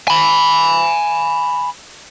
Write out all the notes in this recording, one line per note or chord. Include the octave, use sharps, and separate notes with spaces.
G#5 B5